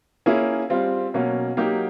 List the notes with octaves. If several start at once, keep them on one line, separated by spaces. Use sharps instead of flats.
A#3 C#4 E4 G#4
G3 C4 F4
B2 F#3 A#3 C#4
F#3 A#3 D#4 G4